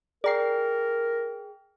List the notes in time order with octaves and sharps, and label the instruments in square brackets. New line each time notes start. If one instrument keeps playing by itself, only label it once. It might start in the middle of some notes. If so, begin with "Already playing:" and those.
[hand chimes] G#4 G5 [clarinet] A#4 [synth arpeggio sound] D5 A#5 C7